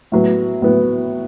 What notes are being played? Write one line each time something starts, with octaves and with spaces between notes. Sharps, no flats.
A2 F#3 B3
A2 F#3 B3